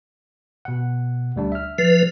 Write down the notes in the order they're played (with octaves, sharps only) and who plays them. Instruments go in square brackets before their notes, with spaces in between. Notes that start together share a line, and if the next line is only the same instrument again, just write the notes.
[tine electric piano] B2 F#5
D2 G3 D4
E5 F6
[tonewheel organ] F3 B4